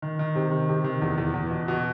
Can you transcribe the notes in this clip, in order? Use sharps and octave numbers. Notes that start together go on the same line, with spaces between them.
D#3
D#3
C3
D#3
C3
D#3
E2
E2
E2
B2
B2